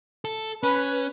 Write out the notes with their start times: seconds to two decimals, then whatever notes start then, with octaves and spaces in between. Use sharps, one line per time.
0.25 A4
0.63 C#4 B4